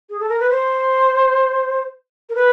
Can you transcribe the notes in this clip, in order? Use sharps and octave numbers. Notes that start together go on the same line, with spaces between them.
G#4
A4
A#4
B4
C5
A#4
B4